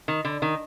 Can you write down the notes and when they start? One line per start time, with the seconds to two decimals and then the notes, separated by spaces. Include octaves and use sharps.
0.08 D#3
0.25 D3
0.42 D#3